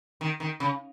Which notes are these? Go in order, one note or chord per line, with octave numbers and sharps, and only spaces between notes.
D#3
D#3
C#3